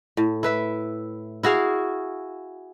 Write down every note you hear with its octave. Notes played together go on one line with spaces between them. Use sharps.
A2
E4 B4 E5
E4 F#4 G#4 F5